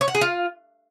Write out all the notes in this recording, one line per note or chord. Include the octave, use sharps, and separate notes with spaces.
C#5
F#5
G#4
F4